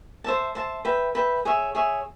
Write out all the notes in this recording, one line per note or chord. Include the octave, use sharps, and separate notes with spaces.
C5 E5 A5
C5 E5 A5
B4 E5 G5
B4 E5 G5
G#4 C#5 E5
G#4 C#5 E5